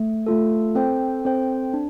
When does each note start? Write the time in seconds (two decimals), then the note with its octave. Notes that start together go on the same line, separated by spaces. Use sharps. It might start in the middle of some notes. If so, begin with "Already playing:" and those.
Already playing: A3
0.26 A3 F4 A4
0.75 C4 A4 C5 G5
1.25 C4 A4 C5 G5
1.74 D4